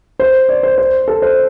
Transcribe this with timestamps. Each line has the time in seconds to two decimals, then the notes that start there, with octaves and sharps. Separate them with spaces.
0.20 C5
0.49 D5
0.63 C5
0.78 C5
1.08 A4
1.22 C5